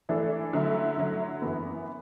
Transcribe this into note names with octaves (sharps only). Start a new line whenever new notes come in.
E3 A3 D4 A4
D3 F#3 A3 E4
D3 F#3 A3 E4
F#2 E3 B3